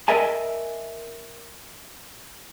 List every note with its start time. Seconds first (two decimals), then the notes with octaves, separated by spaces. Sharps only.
0.08 A#4 D#5 E5 G#5 A5